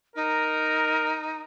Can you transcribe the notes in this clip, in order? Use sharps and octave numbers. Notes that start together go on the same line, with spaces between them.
D#4 A#4